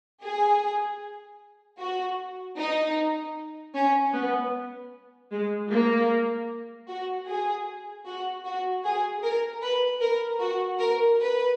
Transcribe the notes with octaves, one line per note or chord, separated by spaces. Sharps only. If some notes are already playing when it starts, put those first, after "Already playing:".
G#4
F#4
D#4
C#4
B3
G#3
A#3
F#4
G#4
F#4
F#4
G#4
A#4
B4
A#4
F#4
A#4
B4